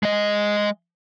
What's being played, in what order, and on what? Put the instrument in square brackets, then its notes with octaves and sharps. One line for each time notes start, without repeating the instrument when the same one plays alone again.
[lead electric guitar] G#3 D#5